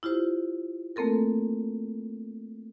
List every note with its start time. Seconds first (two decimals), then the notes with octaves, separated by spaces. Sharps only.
0.03 E4 F4 G4 C5
0.96 A3 A#3 C4 A4 A#4